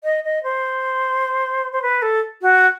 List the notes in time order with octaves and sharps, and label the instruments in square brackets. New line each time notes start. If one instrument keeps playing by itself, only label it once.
[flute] D#5
D#5
C5
C5
B4
A4
F#4